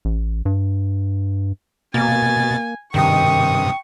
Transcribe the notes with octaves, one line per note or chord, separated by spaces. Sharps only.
A1
G2
B2 A#3 G#5 A6
G2 C3 D#3 G5 C#6 D#6